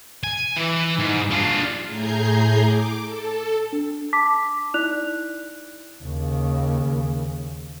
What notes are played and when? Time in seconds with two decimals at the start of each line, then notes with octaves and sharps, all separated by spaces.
0.24 G#5
0.57 E3
0.99 G#2
1.31 D4 F4
1.86 A2 G#4 G#5 A#5 G6 C7
2.63 D6
3.03 A4
3.72 D4
4.13 A5 D6 B6
4.74 D#4 E4 D5 F#6 F7
6.04 D#2 C#3